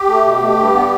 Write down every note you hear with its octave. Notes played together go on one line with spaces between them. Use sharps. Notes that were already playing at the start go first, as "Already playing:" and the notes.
Already playing: G4
A3
B2
A3
G2
B3